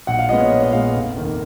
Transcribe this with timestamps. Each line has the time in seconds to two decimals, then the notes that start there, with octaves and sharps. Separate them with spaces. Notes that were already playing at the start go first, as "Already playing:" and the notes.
0.07 A#1 F#5
0.19 F5
0.29 A#2 G#3 B3 D#5
0.40 C#5
0.51 A#1 C#5
0.62 D#5
0.73 A#2 G#3 B3 F5
0.94 F1
1.16 D#2 D#3 A#3